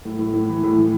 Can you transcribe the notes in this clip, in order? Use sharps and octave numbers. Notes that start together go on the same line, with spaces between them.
A2
A2
A2
E3
A2
E3